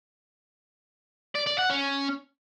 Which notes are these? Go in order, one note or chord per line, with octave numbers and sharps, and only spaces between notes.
D5
D5
F#5
C#4